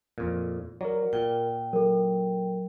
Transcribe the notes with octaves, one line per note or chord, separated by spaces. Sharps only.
F2 A#2
F#3 A#4 D5
A#2 G5
F#3 A4 A#4